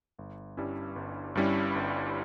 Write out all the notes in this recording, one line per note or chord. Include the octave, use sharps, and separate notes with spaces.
G1
G2 G3 C#4 E4
G1
G2 G3 C#4 E4
G1